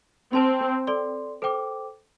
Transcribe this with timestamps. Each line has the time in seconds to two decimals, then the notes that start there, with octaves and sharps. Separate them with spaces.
0.33 C4 C5 A5 C6
0.87 A4 D5 C6
1.42 A4 C5 G5 D6